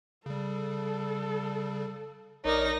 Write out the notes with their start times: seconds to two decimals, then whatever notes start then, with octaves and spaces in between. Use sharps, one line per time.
0.26 C#3 G3 A4
2.45 A#1 D#4 A#4 C#5 D5 D6 D#6 A#6